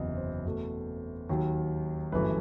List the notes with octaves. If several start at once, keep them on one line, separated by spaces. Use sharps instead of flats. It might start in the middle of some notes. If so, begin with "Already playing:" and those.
Already playing: F#1 E2 C3 F#3 D#5
C5
E2 B2 A3
D#2 D#3 F#3
G1 F#2 E3 A3 B4